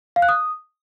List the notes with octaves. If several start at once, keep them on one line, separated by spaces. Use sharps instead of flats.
F5
F#6
D#6